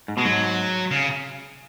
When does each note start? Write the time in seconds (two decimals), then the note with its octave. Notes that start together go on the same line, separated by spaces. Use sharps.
0.08 G#2
0.17 B2 G#3
0.25 G#2 F#3
0.91 C#3